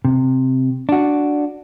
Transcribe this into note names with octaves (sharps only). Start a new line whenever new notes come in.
C3
D4 F#4